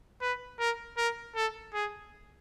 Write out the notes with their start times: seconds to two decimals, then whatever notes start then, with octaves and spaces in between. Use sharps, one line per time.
0.21 B4
0.59 A#4
0.97 A#4
1.36 A4
1.74 G#4